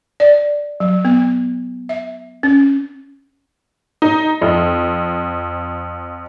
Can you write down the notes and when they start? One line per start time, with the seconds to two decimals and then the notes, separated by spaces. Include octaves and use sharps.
0.20 D5
0.80 F#3
1.05 B3
1.89 E5
2.43 C#4
4.02 D#4
4.42 F2